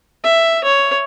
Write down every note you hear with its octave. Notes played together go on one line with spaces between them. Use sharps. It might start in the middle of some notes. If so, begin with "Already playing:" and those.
E5
C#5